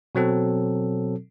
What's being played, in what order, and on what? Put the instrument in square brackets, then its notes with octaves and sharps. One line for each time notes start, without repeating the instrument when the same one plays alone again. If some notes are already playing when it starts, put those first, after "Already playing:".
[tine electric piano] B2 F#3 C4 A4